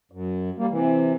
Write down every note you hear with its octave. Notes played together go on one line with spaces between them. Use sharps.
F#2
G3 A#3
C3 E3